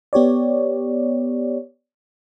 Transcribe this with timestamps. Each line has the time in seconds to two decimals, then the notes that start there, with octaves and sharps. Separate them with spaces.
0.13 B3 G4 C#5 D5